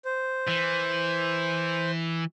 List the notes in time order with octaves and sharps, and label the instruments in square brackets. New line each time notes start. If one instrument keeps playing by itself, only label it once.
[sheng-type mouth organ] C5
[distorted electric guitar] E3